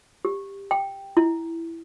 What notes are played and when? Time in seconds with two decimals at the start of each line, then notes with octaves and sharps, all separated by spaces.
0.25 G4
0.71 G5
1.17 E4